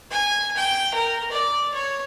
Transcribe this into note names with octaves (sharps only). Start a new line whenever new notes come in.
G#5
G5
A#4
D5
C#5